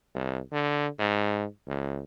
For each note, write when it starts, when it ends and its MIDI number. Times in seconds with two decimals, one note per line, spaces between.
0.14 0.39 36
0.52 0.87 50
0.99 1.45 44
1.67 2.04 37